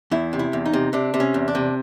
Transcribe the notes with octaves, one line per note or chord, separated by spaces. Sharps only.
E2 E4
C3
E4
E2
D#4
C3
C3 D4
C3
C#4
E2
D4
C3